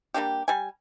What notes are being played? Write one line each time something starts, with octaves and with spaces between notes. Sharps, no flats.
G3 A#3 D4 G4
G3 G#5